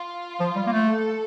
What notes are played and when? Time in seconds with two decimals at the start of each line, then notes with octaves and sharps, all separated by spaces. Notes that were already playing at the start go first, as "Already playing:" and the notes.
Already playing: F4
0.40 F3
0.56 G3
0.67 A#3
0.72 A3
0.88 A4